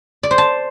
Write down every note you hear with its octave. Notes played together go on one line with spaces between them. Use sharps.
D5
C5
A5